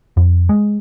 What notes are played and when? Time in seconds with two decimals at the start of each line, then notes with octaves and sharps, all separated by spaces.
0.17 F2
0.49 G#3